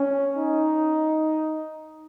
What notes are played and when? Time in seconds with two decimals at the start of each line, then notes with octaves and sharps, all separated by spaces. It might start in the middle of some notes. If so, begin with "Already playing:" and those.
Already playing: C#4
0.37 D#4